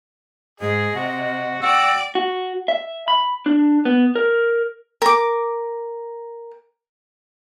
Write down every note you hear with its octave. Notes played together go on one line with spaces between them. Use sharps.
G#2 G#4 D#5
C3 F#4
F#4 D5 G5 E6
F#4
E5
B5
D4
B3
A#4
A#4 D6